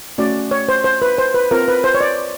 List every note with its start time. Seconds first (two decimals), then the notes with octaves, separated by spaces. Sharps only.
0.18 A3 C#4 F#4 D5
0.51 C#5
0.69 C5
0.84 C5
1.02 B4
1.18 C5
1.35 B4
1.51 C4 F4 A#4
1.68 B4
1.84 C5
1.95 C#5
2.01 D5